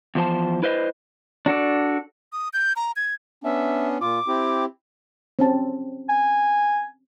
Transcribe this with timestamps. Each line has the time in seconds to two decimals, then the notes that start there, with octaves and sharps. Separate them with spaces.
0.15 E2 F3 C5 A5
0.62 E4 B4 C5 D#5
1.46 D4 F#4 A4 D5
2.33 D#6
2.53 G6
2.76 A#5
2.96 G#6
3.44 B3 C#4 D4 E5
4.01 A#2 F4 D6
4.28 C4 E4 G4
5.39 C4 C#4 A5
6.09 G#5